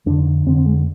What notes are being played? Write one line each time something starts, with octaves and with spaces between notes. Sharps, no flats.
F2 D3 D4
F2 D3 C4
C4
G#3